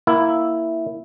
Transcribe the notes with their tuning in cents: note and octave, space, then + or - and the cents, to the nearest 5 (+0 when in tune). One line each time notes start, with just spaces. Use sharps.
A#3 +0 E4 +0